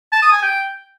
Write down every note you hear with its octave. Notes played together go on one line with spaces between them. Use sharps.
A5
D#6
G#5
G5